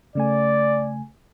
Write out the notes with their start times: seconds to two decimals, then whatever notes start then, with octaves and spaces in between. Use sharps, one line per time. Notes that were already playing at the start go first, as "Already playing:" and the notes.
0.15 C#3 A3 D5 G#5